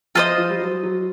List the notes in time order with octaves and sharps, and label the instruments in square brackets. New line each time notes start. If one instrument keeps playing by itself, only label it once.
[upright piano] F3 [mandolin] F4 A4 C5 D#5
[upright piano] F3
G3
F#3
F#3